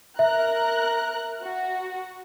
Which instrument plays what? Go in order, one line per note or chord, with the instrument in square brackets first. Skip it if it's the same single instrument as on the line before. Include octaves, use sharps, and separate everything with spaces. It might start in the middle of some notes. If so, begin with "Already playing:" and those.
[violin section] A#4 A#5 F#6 [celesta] E5
[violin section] F#4